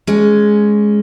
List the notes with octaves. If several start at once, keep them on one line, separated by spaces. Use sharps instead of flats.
G#3 C#4